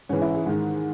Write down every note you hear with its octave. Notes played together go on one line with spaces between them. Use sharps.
G#2 E3 C#4
E4
G#4
G#2 D#3